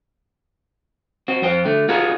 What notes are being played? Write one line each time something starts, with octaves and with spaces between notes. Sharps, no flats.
C4 F#4
F2 C5 G5
D3 A3
F4 F#4 G#4 A#4